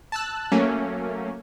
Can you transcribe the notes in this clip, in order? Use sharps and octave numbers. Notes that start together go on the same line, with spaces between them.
A5 E6 F#6
F#3 A3 A#3 C#4